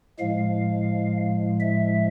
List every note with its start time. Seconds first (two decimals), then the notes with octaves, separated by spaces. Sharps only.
0.19 A2 F3 G#3 F5
1.60 E5